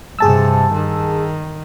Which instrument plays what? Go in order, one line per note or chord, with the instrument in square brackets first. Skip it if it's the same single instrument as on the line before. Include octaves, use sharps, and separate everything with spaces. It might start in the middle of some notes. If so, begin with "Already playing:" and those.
[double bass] G2 C3 [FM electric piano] G#4 A5 E6
[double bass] D#3